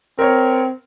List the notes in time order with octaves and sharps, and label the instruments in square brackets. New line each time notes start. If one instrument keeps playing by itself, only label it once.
[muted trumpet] C4 [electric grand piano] A#4 C#5